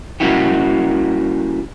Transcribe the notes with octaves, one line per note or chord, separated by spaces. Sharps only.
G3 A#3 C#4 E4 F#4 G4